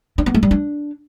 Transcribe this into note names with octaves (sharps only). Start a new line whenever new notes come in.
D4
B3
A3
G3
D4